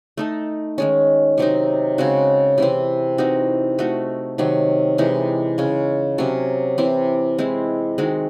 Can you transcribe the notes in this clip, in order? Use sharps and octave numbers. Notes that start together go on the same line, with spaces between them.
A3 D#4 A4
D#3 G#3 C#4
C3 F#3 C4 D#4
C#3 G#3 C4 F#4
C3 E3 C4
E3 C4 D#4 F#4
A3 D#4 F#4
C3 D#3 F#3 C4
C3 E3 G#3 D#4
C#3 G#3 C#4
C3 F#3 C#4
C3 E3 C4
G#3 C4 E4
D#3 G#3 C4 F#4